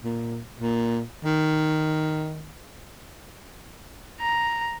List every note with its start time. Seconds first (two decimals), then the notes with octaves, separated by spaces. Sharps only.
0.04 A#2
0.59 A#2
1.24 D#3
4.21 A#5